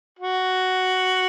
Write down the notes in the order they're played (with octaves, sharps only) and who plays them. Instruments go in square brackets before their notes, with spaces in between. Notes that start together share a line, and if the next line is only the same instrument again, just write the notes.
[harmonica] F#4